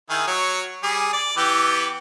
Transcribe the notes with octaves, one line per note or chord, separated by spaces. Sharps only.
D#3 E4 G#4
F#3 C#5
G3 G#4
D5
E3 B3 G4